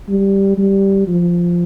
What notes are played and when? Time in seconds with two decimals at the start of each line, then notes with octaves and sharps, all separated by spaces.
0.08 G3
0.58 G3
1.08 F3